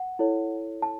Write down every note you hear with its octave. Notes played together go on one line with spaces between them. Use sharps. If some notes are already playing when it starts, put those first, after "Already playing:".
Already playing: F#5
E4 A4 C#5
A5